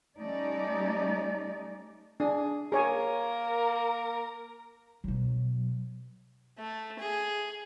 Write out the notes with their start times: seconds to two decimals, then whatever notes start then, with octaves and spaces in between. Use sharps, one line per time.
0.19 G3 A3 C#4 D#4 D5
2.20 D4 G#4
2.72 A#3 G#4 A#4 C#5 G#5
5.04 B2 F#3
6.58 A3
6.99 G#4